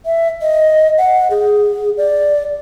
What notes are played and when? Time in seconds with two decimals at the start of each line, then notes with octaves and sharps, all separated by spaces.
0.06 E5
0.42 D#5
0.98 F#5
1.31 G#4
1.97 D5